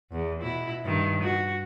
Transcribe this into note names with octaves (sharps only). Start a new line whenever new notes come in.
E2
B2 E4
G2 D#3
F#4